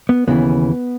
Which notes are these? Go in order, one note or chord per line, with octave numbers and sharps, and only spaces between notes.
B3
D#2 C#3 E3 B3